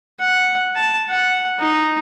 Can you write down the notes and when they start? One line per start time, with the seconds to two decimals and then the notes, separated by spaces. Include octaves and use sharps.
0.19 F#5
0.76 A5
1.09 F#5
1.59 D#4